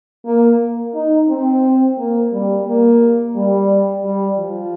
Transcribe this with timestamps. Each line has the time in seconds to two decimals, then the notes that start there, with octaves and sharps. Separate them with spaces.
0.26 A#3
0.95 D#4
1.29 C4
1.98 A#3
2.32 G3
2.67 A#3
3.36 G3
4.04 G3
4.38 F3